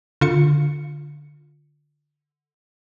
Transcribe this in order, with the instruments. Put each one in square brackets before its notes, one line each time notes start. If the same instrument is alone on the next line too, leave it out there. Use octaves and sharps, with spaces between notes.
[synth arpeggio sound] D3 F4 C#7